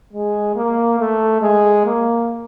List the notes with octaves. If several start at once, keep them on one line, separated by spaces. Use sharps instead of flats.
G#3
A#3
A3
G#3
A#3